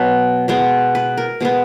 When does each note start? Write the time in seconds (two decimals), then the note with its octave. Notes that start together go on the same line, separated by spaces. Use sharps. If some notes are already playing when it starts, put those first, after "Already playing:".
Already playing: B2 F#3 B3 B4
0.48 B2 G#3 B3
0.95 B4
1.17 A#4
1.41 B2 G#3 B3